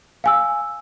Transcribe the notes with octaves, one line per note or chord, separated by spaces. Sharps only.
F5 G#5 E6